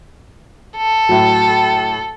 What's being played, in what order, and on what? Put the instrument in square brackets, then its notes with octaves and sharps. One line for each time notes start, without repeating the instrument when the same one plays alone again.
[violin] A4
[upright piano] A2 F#3